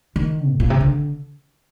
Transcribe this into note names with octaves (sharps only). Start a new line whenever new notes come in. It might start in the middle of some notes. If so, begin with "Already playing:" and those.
D#3
A2
A#2
C3
D3